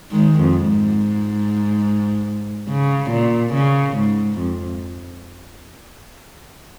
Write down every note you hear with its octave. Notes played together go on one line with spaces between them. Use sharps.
D#3 G#3
F2
G#2
C#3
A#2
C#3
G#2
F2